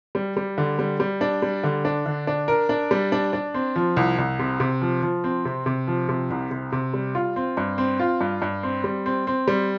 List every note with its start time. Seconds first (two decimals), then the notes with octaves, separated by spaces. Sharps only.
0.15 G3
0.37 G3
0.58 D3
0.79 G3
1.00 G3
1.21 D4
1.42 G3
1.63 D3
1.85 D4
2.06 D3
2.27 D4
2.48 A#4
2.69 D4
2.91 G3
3.12 D4
3.33 D4
3.54 C4
3.76 F3
3.97 C2
4.18 C2
4.39 C3
4.60 C3
4.82 F3
5.02 F3
5.24 C4
5.45 C3
5.66 C3
5.87 F3
6.09 C3
6.30 C2
6.51 C3
6.72 C3
6.94 G3
7.15 F4
7.36 C4
7.57 G2
7.78 C4
8.00 F4
8.21 G2
8.42 G2
8.63 C4
8.84 G3
9.06 C4
9.27 C4
9.47 G3